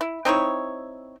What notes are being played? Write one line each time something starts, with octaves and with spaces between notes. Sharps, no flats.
E4
C4 D#4 E4 C#5